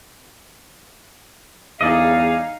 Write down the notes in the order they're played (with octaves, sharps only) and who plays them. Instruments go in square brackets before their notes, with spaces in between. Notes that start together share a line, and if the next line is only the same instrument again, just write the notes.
[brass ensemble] G1 E2 [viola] D#4 [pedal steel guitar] G#4 D5 D#5 [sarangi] F5